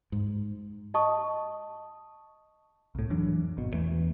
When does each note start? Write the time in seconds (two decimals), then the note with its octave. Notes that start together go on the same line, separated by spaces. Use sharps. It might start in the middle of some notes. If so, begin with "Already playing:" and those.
0.12 G#2
0.94 D#5 A5 C#6 D#6
2.95 C2 A2
3.10 F2 E3 F#3 D4
3.57 G#1 B2
3.73 E2 E3 A3